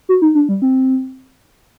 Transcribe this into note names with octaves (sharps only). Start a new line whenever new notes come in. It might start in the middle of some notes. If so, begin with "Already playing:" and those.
F#4
D#4
D4
G3
C4